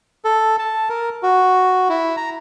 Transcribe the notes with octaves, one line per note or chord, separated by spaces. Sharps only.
A4
A5
A#4
F#4
E4
A#5